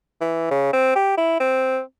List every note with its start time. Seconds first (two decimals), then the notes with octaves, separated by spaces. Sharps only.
0.21 E3
0.51 C#3
0.73 C4
0.96 G4
1.18 E4
1.40 C4